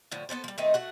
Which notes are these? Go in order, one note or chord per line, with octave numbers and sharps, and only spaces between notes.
A2 D3 F3
B3 D4 A4 C5
F3 G3
D#3 A3 C4 D#4
A3 F#4 F#5